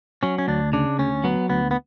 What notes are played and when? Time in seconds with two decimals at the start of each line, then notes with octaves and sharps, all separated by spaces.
0.23 F#3 C#4
0.38 C#4
0.48 D2 D4
0.73 C#3 D4
0.99 D2 C#4
1.24 F#3 B3
1.50 D2 B3
1.71 B3